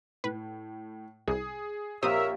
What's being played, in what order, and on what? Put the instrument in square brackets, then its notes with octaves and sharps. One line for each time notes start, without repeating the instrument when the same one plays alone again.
[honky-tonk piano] A2 [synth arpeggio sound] B4
[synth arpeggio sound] C2 [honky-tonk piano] G#4
[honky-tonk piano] A#1 [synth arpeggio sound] C4 D#6 [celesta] G4 F5 [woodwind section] A#4 C#5 E5